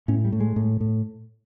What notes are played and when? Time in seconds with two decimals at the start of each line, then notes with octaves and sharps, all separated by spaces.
0.08 A2 C#4
0.25 G3
0.32 A2
0.40 G#3
0.56 A2
0.80 A2